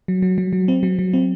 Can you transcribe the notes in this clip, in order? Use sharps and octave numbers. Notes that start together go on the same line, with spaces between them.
F#3
F#3
F#3
F#3
C4
F#3
F#3
C4